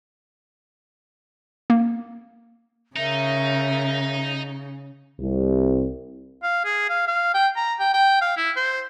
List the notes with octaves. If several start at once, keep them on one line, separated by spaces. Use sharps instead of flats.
A#3
C#3 D#4 A#4 E5
C2
F5
G#4
F5
F5
G5
A#5
G5
G5
F5
E4
C5